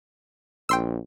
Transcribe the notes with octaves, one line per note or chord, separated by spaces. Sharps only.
A#1 G5 C6 E6